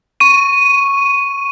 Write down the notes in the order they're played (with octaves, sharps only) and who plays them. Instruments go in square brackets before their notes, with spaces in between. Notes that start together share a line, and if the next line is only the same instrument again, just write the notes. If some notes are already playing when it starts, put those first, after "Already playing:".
[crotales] C#6 D#7